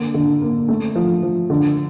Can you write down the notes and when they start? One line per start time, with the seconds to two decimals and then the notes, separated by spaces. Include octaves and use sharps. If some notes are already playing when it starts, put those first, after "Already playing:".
Already playing: D3 A#3
0.14 D3
0.41 A#3
0.68 A3
0.96 F3
1.23 F3
1.50 D3